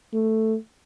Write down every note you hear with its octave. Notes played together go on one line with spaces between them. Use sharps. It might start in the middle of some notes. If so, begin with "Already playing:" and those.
A3